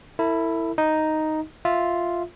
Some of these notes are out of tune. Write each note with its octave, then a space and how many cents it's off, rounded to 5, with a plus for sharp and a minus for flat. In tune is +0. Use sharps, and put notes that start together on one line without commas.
E4 +0 A4 +45
D#4 +0 D#5 +0
F4 +0 E5 +0